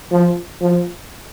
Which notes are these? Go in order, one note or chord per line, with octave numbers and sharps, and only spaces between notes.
F3
F3